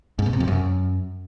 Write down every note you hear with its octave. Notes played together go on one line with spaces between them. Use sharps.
G#2
B2
C3
F2
F#2